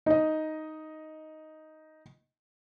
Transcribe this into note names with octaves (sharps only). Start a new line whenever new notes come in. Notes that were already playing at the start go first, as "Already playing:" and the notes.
D#4 D#5